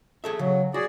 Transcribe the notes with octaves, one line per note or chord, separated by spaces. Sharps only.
G#4 A4 E5
C#3 F#3
F#4 G#4 D5